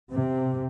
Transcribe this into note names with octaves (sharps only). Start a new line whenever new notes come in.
C3